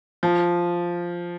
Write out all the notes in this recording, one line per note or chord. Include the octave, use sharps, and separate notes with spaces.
F3